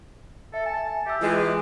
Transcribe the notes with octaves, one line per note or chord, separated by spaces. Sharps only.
A4 E5
G#5 A5
G4 E5 E6
E3 G#3 F4